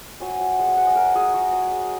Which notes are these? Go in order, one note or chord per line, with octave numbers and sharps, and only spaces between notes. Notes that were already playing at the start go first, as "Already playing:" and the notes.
F#3 G#5
F#3
G#3 F#5
G#5
G#3 F#5
D#5
F#3 A#4
F#3 G#4
F#3 F#4
F#3
G#3